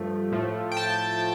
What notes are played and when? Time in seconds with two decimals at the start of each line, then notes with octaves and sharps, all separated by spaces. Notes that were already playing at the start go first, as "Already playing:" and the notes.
Already playing: G2 F3 A3
0.32 A2 F3 A3
0.72 G5
0.77 A5